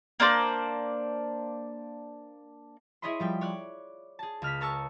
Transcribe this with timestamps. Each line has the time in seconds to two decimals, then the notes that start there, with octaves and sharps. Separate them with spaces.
0.20 A#3 D4 C5 D5
3.02 E4 G#4 C#5 D#5 B5 C6
3.20 F3 G3 G5
3.41 C#5 D5 F#6
4.19 G#4 A5
4.42 C#2 F6 B6
4.60 A#4 C#5 A5 C#6 E6